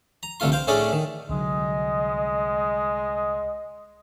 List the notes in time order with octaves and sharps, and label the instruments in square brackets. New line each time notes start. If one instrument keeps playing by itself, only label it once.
[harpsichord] A#5
C2 D3 A3 F4 C6
C5 F5 G5
A2 A3 C#4 D4 G#4 D5
D#3
[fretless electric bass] C2 D3 F#3 [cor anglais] G#3 [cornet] D#5